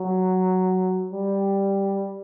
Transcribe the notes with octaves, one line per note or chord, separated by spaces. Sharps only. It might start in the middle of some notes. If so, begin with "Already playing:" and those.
Already playing: F#3
G3